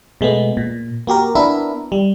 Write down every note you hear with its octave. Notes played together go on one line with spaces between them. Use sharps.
B2 G#3 A3 B3
A#2
A#3 F#4 G4 A#4
B3 D4 E4 A#4 E5
G3